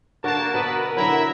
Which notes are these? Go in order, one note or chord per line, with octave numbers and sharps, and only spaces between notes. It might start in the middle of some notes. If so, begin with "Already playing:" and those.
D3 A#3 F#4 A#4 A5
B2 B3 A4 B4
D3 F#3 E4 E5 A#5 B5